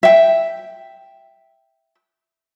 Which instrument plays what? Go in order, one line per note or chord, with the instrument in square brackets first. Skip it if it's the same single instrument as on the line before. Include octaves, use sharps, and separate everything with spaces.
[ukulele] E5 G5